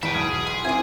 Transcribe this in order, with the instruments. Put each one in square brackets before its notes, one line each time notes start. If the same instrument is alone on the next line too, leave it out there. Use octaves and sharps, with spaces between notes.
[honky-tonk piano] E2 [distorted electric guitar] E5 G5 [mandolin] B5
[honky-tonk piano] B1 D7 [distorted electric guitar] G#4
[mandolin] C6
[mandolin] A#3 G#5 [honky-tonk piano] C4 E4